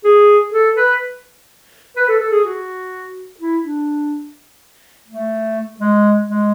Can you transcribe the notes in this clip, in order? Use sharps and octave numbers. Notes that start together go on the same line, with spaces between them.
G#4
A4
B4
B4
A4
A4
G#4
F#4
E4
D4
A3
G#3
G#3